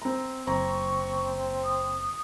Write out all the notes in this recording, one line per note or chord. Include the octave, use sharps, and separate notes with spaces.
C4 A#5
F#1 C4 A#5 C#6
D#6